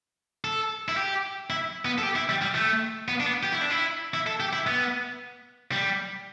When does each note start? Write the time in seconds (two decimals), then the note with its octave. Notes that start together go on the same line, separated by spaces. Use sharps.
0.44 A4
0.89 E4
0.97 G4
1.50 E4
1.85 B3
1.98 A4
2.03 G4
2.16 E4
2.29 G3
2.42 G3
2.55 A3
3.08 B3
3.20 D4
3.26 B3
3.43 G4
3.52 E4
3.62 D4
3.71 E4
4.14 E4
4.26 A4
4.40 G4
4.53 E4
4.66 B3
5.72 G3